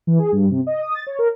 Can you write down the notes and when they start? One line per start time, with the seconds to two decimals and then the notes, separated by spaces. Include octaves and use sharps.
0.07 E3
0.19 G#4
0.32 G2
0.51 C3
0.67 D#5
0.82 D#6
0.95 A6
1.07 C#5
1.19 A#4